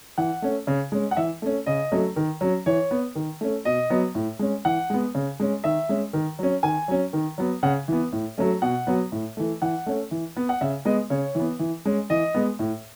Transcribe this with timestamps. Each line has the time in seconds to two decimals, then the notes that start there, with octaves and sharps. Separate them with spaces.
0.18 E3 F#5
0.42 A3 C#4
0.67 C#3
0.92 G#3 C#4
1.11 F#5
1.17 E3 E5
1.42 A3 C#4
1.66 C#3 D#5
1.92 F#3 A3 C#4
2.16 D#3
2.41 F#3 C#4
2.66 E3 C#5
2.91 B3
3.15 D#3
3.41 A3 C#4
3.65 B2 D#5
3.90 F#3 B3
4.15 A2
4.39 G#3 C#4
4.65 E3 F#5
4.90 G#3 B3
5.15 C#3
5.40 G#3 C#4
5.64 D#3 E5
5.89 G#3 C#4
6.13 D#3
6.39 F#3 C#4
6.63 D#3 G#5
6.88 F#3 C#4
7.13 D#3
7.38 F#3 B3
7.63 C#3 F#5
7.88 E3 B3
8.12 A2
8.38 F#3 A3 C#4
8.62 B2 F#5
8.87 F#3 B3
9.12 A2
9.37 E3 A3
9.62 E3 F#5
9.86 A3 C#4
10.11 E3
10.36 B3
10.49 F#5
10.61 C#3 E5
10.85 G#3 B3 D#5
11.10 C#3 C#5
11.35 E3
11.40 B3
11.59 E3
11.85 G#3 C#4
12.10 E3 D#5
12.34 G#3 B3
12.59 A2